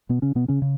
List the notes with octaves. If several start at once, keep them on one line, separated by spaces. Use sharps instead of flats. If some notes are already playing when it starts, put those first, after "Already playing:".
B2 B3
C#3 C#4
B2 B3
C#3 C#4
C#3